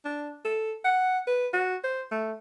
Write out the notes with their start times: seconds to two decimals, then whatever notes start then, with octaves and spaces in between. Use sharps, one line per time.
0.05 D4
0.45 A4
0.85 F#5
1.27 B4
1.53 F#4
1.84 C5
2.11 A3